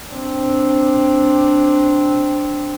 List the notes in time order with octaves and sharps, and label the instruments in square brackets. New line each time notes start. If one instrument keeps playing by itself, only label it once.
[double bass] C4 D4